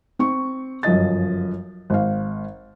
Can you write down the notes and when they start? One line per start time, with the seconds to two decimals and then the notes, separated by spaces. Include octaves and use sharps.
0.19 C4 C#6
0.83 G1 F#2 F3 D#5 A6
1.90 G#1 F5